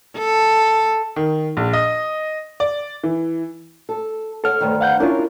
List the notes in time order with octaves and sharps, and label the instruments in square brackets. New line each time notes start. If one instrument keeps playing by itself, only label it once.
[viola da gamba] A4
[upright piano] D#3
A#1
D#5
D5
E3
[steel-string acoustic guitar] A4
[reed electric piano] A4 F6 [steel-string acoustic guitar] C#5 F#5
[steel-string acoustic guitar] D2 G2 D#3
[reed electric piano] F5 F#5 G6
[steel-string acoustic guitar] C#4 A#4 [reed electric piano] D4 E4 F4